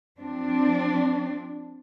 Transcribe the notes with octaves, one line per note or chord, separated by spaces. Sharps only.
F3 C4 D4